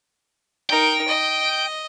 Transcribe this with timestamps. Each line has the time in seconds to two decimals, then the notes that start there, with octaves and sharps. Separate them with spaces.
0.70 D#4 A#4 G5
1.08 D#5